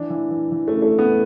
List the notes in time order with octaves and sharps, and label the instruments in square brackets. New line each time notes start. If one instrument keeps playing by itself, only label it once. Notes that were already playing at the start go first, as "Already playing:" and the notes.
Already playing: [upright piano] E3 D4
E3
E3
E3
A3
C#3
A3
C#3
B3